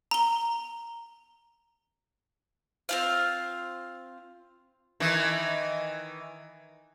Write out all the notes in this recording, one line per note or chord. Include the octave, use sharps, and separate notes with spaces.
A#5 G7
C4 F4 F5
D#3 E3